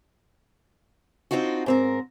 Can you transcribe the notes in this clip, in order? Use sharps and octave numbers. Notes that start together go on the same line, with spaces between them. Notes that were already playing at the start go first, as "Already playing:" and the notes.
C4 D4 D#4 F4 F#4
G#2 C4 A#4